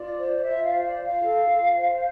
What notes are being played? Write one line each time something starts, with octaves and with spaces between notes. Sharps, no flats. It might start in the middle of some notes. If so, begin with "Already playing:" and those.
Already playing: F4 D5
C5
D5
F4 E5
F5
C5
D5
F4
F5
A4
F4
C5